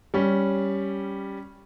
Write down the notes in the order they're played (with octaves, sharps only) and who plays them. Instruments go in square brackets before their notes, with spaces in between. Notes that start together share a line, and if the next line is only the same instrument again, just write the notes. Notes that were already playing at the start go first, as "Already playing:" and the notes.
[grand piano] G3 C#4